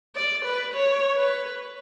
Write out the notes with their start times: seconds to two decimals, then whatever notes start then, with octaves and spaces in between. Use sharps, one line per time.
0.16 D5
0.45 B4
0.74 C#5
1.18 B4